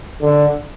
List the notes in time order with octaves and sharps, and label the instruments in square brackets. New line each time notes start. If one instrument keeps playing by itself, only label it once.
[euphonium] D3